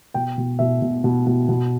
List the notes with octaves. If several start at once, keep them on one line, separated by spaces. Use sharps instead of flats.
B2 G5
B2
B2 E5
B2
B2
B2
B2